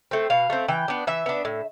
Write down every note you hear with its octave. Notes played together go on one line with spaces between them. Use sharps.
A3 C4
B2 F5
A3 C4
E3 G5
B3 D4
E3 E5
B3 D4
A2